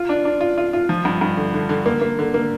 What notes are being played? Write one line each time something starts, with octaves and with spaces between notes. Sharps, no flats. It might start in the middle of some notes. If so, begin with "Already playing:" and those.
Already playing: F4
D4
D4
F4
F4
F4
F3
G2
G2
D3
D3
D3
A#3
A#3
D3
A#3